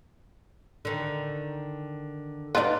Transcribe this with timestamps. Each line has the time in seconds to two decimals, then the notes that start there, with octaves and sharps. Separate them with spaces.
0.85 D3 D#3
2.55 D#4 F4 B4 D5